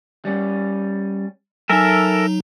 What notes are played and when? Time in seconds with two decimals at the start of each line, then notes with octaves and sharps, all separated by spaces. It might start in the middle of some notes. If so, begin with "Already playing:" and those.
0.25 G3 C#4
1.69 F#3 D#4 A4 A#4 E5 G#5